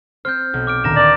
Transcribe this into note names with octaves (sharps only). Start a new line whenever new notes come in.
C4 C5 F6 G6
B1
D6 F6 D7
D2 A#2 D#3 A#5 A#6 E7
C4 A#4 D5